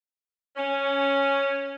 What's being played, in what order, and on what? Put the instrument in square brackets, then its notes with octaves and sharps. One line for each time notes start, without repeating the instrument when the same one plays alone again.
[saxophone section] C#4